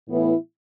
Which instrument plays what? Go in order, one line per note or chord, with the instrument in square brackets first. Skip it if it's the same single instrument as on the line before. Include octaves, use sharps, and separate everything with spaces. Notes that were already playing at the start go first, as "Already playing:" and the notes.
[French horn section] A2 E3 B3 E4